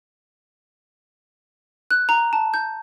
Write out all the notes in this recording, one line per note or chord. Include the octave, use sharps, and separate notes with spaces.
F#6
A#5
A5
G6